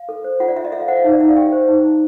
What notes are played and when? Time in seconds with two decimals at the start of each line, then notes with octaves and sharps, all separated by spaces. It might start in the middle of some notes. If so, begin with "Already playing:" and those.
Already playing: F5
0.09 A4
0.24 C5
0.40 F4 F#5
0.48 D5
0.56 F4 E5
0.65 D#5
0.72 A4 E5
0.80 F5
0.88 C5 F#5
0.97 F5
1.04 D#4 E5
1.13 D5
1.20 D#4 E5
1.28 F5
1.37 G4 G5
1.52 C5
1.68 D#4
1.85 D#4